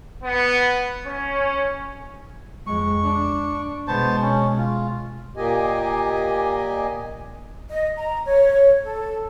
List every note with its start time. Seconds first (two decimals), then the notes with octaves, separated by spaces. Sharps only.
0.22 B3
1.06 C#4
2.67 F2 G#3 C#6
3.04 D4
3.88 B2 G#3 B3 C5 A5
4.22 C#4
4.58 F4
5.37 A#2 A#3 G4 D#5 G#5
7.69 D#5
7.97 A#5
8.26 C#5
8.83 A4